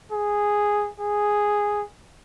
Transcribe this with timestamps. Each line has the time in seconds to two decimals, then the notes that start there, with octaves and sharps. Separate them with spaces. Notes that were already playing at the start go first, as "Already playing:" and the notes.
0.12 G#4
1.00 G#4